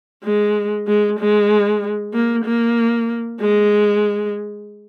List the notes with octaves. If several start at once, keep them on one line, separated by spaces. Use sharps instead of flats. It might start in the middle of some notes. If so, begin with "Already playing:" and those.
G#3
G#3
G#3
A#3
A#3
G#3